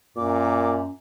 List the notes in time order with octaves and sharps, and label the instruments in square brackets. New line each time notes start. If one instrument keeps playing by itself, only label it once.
[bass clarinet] F#2 [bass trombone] A#2 [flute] D6